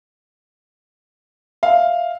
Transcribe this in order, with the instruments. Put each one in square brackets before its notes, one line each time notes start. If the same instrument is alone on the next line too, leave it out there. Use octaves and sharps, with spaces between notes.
[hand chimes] E5 [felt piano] F5